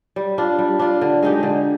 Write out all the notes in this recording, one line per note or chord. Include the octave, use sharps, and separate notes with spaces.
G3
D4 F4
G3
D4 F4
D3
G#3 D#4 G4
D3